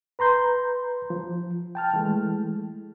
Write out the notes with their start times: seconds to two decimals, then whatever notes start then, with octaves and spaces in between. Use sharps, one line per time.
0.19 B4 A#5 C6 G6
1.10 F3
1.75 G5 A5 F6
1.94 E3 G#3 A3